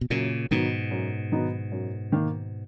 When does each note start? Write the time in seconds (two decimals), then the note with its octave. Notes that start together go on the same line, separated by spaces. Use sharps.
0.01 B2
0.10 F#2 A#2 C#3
0.51 G#2 B2 D#3 F#3 B3 D#4
0.91 F#2
1.32 D#3 F#3 B3 D#4
1.72 F#2
2.12 D#3 A#3